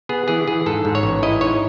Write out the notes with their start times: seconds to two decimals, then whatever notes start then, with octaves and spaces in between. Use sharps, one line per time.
0.09 B3 G#4
0.28 E3 G#4
0.47 E3 G#4
0.66 G#2 A4
0.85 G#2
0.95 C#5
1.03 A1
1.23 E4 D#5
1.41 G#2 C#5